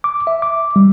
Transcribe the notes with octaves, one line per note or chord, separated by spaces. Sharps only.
D6
E5
D6
G3